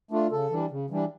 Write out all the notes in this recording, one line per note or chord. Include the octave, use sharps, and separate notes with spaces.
A3 D4 F4
C#3 A4
E3 G3 D4
C#3
E3 G3 D4